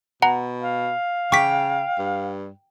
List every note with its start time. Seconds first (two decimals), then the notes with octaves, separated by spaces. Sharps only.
0.22 B2 F#5 A#5
0.62 F5
1.32 C#3 G5 C#6 D6 B6
1.99 G2